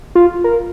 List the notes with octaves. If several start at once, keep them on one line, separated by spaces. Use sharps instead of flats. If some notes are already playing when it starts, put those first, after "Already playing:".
F4
A#4